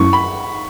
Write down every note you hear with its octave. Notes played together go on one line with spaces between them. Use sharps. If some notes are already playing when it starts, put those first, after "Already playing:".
Already playing: F#2 F#3 A3 C#4 E4 C#6
B5